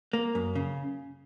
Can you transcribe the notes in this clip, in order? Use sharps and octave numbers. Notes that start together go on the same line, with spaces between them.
A#3
F#2
C#3